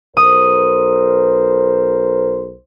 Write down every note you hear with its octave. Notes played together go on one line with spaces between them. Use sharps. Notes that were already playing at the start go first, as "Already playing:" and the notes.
B1 A#4 C5 D#6